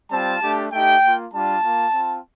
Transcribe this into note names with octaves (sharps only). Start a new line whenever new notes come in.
G3 C4 F4 A5
A3 D4 G4
A3 D#4 G4 G5
A#3 F4
G3 D4 F4 A5
A#3 F4
C4 F4